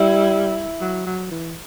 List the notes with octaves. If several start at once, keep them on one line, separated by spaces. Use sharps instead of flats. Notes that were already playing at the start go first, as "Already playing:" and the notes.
Already playing: G3 E4
F#3
F#3
E3